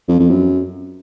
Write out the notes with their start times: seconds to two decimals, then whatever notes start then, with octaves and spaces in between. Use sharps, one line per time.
0.08 F2
0.19 F2
0.30 F#2